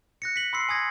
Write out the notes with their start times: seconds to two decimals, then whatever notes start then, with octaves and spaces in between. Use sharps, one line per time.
0.22 F#6 A#6 C#7
0.36 B6 F#7
0.53 B5 C6 E6 C7
0.69 G#5 D#6 G#6 A#6